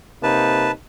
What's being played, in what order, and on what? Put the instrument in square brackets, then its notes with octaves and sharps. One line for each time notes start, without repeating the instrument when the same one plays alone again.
[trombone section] C3 A#3 D#4 [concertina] B4 A5